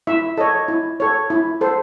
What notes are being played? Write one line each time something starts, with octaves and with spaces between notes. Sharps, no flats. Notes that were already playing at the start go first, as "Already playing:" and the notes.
E4 E5
A4 C#5 D#5
E4
A4 C#5
E4
A4 C5